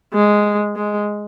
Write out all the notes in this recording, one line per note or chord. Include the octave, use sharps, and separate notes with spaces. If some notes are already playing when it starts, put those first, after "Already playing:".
G#3
G#3